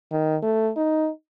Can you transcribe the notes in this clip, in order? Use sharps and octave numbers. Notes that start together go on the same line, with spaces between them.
D#3
A3
D#4